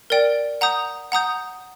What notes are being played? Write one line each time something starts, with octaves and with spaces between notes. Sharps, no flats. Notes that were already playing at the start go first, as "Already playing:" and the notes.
A#4 D5 G5
F#5 A#5 D#6 G6
F#5 A#5 D#6 G6